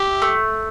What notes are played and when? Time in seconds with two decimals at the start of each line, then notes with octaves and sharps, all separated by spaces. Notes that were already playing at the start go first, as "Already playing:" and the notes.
Already playing: G4 E5
0.22 A3